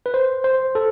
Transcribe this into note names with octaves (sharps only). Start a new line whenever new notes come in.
B4
C5
C5
A4